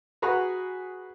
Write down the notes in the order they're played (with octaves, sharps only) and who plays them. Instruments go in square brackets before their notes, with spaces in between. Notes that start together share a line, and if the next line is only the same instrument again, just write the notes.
[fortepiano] F#4 G#4 B4 F#5 A#5 C#6